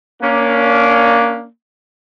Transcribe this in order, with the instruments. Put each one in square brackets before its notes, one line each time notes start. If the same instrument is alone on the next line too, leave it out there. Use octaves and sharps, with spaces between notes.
[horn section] A#3 C#4 D4